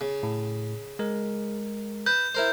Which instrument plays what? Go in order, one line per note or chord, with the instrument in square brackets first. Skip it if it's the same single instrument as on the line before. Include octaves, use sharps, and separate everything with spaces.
[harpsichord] C#3
[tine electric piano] A2
G#3 A#4
[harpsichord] B4 [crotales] G6
[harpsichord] E4 A#4 C5